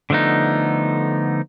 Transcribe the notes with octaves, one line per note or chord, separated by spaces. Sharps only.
D3 F3 A3 B3 D#4